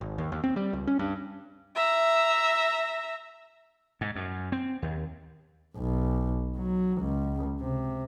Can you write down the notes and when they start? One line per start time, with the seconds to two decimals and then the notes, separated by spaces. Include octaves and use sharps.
0.01 G#1
0.18 D#2
0.32 D#2
0.44 C4
0.56 G3
0.73 C#2
0.87 C#4
0.99 G2
1.76 E5 A#5
4.01 G#2
4.16 F#2
4.52 C4
4.82 D#2
5.77 B1
6.57 F#3
7.02 C#2
7.61 C3